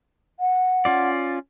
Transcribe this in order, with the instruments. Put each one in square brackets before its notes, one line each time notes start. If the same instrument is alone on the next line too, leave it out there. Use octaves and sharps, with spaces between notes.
[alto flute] F#5
[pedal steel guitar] C#4 F4 D5